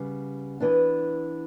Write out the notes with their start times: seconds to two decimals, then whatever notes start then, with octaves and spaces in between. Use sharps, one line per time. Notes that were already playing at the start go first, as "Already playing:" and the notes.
Already playing: C#3 G3 B3
0.60 E3 B3 D4